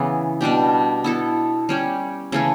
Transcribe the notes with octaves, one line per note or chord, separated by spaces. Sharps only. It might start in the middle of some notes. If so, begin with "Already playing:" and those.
Already playing: C#3 E3 B3 E4
B2 G3 D4 G4
B3 E4 A4
G3 C#4 G4
C#3 E3 A3 C#4